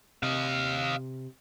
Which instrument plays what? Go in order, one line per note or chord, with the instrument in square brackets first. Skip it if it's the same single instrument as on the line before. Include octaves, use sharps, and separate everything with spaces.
[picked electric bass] C3 [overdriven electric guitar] D#5 F5